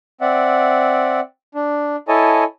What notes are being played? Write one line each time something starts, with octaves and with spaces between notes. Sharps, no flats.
C4 D5 E5 F#5
D4
E4 A4 C#5 D#5 G#5 A5